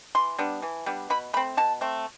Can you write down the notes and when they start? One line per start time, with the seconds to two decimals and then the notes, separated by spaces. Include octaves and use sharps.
0.15 E3 C6
0.38 G3 B3 D4
0.62 E3
0.86 G3 B3 D4
1.10 B2 B5
1.33 A3 B5
1.37 C4
1.57 B2 A5
1.81 A3 C4